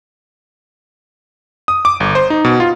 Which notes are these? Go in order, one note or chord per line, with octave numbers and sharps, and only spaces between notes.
D#6
D6
G1
C5
D#4
B2
F4